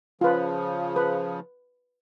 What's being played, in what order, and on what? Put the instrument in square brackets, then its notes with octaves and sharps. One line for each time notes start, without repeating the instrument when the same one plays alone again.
[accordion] C#3 F3 [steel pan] F4 B4
[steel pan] B4